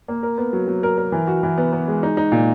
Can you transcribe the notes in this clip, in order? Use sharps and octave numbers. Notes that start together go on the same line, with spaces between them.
A#3
A#4
B3
F#3
F#3
A#4
A#4
E3
F#4
E3
B3
B3
G#3
D#4
D#4
A#2